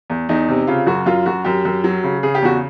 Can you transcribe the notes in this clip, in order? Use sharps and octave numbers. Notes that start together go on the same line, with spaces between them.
E2
E2 D#4
C3
C#3 F4
F#2 F#4
F#2 F4
F#2 F#4
F#2 G4
F#2
F#3
C#3
C#3 G#4
G4
E2 F#4